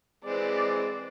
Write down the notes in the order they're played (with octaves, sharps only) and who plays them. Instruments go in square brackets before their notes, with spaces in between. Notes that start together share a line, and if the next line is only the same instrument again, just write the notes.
[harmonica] E3 G#3 C4 [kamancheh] D5